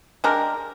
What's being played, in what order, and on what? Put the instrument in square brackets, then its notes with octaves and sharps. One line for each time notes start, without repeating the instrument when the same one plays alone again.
[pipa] G#3 D4 G4 A#4